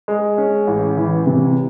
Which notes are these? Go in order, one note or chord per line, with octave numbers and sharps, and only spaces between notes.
G#3
C#4
A1
E3
C3